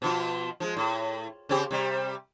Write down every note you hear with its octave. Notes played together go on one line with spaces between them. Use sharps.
B2 F3 F4
F3 G#3
A2
C#3 C4 G4
C3 G3